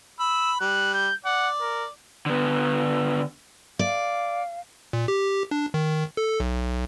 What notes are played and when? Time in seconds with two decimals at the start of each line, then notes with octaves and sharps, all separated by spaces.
0.20 B5 E6
0.61 G3 F#6
0.94 G6
1.25 D5 F#5
1.61 A#4
2.26 D3 B3
3.79 D5 F5
4.93 A#2
5.08 G4
5.51 D4
5.74 D#3
6.17 A4
6.40 B1